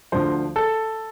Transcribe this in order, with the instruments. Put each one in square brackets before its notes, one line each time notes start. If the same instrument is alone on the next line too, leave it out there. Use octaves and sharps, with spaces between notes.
[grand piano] D2 D3 F3 C5
A4